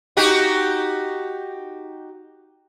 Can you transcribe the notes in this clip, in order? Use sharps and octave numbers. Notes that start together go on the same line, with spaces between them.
D#4 F#4 G4